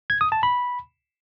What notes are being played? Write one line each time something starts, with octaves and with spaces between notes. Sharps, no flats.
G#6
D#6
A5
B5